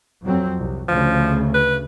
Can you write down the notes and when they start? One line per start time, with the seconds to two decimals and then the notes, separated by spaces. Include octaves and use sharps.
0.23 F2 F#3 C4
0.58 C2
0.88 D2 C#3 F3
1.54 B4